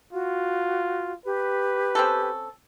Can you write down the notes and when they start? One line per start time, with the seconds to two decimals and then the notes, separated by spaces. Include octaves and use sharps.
0.13 F4 F#4
1.26 G4 B4
1.95 C4 C#4 A4